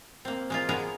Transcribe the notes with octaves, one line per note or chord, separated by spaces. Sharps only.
A#3 C4
G#3 A#3 F4
G#3 B3 G#4 A#4